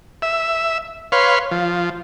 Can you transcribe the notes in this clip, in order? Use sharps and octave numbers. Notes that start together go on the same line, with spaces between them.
E5
B4 C#5 F5 C6
F3